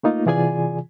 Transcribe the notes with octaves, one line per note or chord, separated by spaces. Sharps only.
A3 A#3 D#4 F4
C3 E3 F4 G#4 D5 G#5